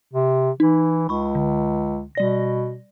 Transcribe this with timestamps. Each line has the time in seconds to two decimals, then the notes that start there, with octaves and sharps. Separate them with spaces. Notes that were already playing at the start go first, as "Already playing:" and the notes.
0.14 C3
0.60 E3 D#4
1.09 C#2 B5 C#6
1.35 D3
2.15 B2 G3 D5 A#6